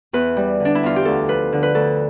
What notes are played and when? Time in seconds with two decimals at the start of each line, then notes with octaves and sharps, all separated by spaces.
0.13 E2 B4
0.37 G3
0.60 D3
0.65 D4
0.75 E4
0.83 E2 F4
0.96 G4
1.05 D2 A4
1.28 F3 B4
1.52 D3
1.63 B4
1.74 D2 A4